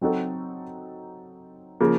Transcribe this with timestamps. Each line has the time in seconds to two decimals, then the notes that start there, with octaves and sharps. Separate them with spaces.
0.01 F#3 C4 D#4 F#4 A4
1.80 C#3 F3 A#3